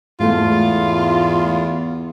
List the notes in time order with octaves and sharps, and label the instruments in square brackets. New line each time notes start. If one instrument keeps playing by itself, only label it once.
[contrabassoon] E2 [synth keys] G#2 A3 [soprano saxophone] F4